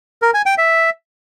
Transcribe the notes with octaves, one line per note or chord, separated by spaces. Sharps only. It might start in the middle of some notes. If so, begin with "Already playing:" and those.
A#4
G#5
G5
E5